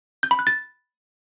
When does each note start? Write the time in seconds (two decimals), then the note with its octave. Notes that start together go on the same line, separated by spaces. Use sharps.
0.23 G6
0.31 B5
0.39 F#6
0.47 A6